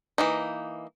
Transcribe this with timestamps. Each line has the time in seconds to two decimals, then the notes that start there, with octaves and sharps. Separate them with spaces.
0.18 E3 A#3 D#4